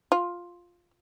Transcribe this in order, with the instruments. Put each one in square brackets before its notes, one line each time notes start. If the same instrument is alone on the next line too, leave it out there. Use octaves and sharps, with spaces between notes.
[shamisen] F4